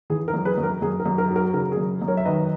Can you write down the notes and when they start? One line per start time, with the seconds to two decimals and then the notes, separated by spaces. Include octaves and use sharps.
0.10 E3 G#4
0.28 A#4
0.34 F#2
0.45 G#4 B4
0.58 F#2
0.63 A#4
0.82 F#2 G#4
1.00 A#4
1.06 F#2
1.18 A#4
1.30 F#3
1.36 A#4
1.54 C#3 A#4
1.72 G#4
1.77 F#2
2.02 F#2
2.08 A#4 C#5
2.17 E5
2.25 D#3 B4 D#5